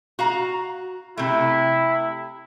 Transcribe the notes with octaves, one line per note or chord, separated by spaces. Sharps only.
F#4 F5 A#5
C3 A3 E4